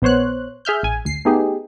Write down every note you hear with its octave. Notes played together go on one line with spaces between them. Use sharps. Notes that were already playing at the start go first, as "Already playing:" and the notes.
A#1 B3 C5 C#5 F#6
G#4 E5 F6 G6
A1 G#5
D2 C7
A3 B3 D#4 G4 G#4